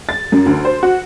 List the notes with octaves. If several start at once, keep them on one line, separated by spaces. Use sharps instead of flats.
A6
F#2
D2
C5
F#4